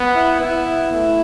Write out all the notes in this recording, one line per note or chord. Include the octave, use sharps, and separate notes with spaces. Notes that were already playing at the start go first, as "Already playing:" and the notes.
Already playing: B3
E4
B3 E4
A3 E4